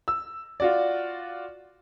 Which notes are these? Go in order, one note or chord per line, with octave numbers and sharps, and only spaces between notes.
E6
F4 F#4 D5